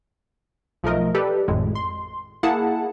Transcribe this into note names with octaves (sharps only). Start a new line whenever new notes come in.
B1 F3 A3 A#4 D#5
G4 A4 B4 D5
G#1 F2 A2 G#3
C6
A#3 E4 G#4 F#5 A5